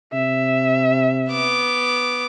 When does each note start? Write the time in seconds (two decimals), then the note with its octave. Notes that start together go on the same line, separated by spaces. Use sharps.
0.13 C3 E5
1.31 B3 D6